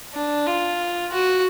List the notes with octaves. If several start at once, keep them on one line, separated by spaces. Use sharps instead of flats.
D4
F4
F#4